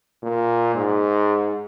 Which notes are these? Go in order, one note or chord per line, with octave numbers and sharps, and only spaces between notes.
A#2
G#2